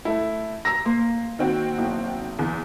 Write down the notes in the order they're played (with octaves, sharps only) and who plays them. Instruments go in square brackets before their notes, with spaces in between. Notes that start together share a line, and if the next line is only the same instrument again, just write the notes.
[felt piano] A3 E4
A#5 E6 A#6
[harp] A#3 [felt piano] C6
[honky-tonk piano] D#3 C4 F#4
[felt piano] F#1 B1
[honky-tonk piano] E2